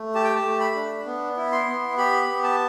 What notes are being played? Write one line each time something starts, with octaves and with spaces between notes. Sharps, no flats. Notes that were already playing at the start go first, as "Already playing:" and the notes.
Already playing: A3
G4 A5
G5
A5
A3
B5
D4
B3
E4
C6
B3
G4 B5
B3
A5